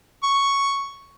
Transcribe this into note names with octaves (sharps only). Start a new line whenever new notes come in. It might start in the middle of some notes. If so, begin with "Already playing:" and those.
C#6